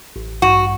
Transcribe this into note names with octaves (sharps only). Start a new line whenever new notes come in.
A1
G2 F#4